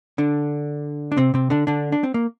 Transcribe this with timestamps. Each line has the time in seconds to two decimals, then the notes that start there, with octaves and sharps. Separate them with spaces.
0.18 D3 D4
1.12 D4
1.17 C3 C4
1.34 C3 C4
1.50 D3 D4
1.67 D3 D4
1.92 D4
2.04 C4
2.14 A#3